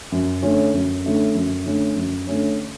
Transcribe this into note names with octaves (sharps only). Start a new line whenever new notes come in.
F#2
D3 A3 C#4
F#2
D3 A3 C#4
F#2
D3 A3 C#4
F#2
D3 A3 C#4